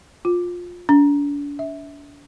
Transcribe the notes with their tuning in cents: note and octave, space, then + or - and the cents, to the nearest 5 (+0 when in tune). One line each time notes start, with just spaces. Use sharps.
F4 +15
D4 -40
E5 -20